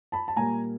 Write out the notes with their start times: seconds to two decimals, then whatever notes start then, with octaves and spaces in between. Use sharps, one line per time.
0.12 A5 B5
0.28 A5
0.36 A#2 G3 A#3 G#5 A#5